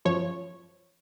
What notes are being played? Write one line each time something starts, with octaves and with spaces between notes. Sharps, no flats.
F#2 F3 C#5